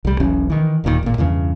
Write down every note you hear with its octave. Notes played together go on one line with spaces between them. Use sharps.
C2 G3
E1 B1 E3 C#4
D#3 E3
D#1 D#2 A#2 D#3
G#1 A#2
E2 G2 C#3 E3